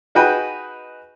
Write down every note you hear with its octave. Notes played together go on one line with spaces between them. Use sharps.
D#4 F#4 G#4 B4 G5